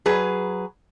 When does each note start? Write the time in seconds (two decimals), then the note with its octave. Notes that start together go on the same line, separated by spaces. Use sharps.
0.06 F#3 G#4 B4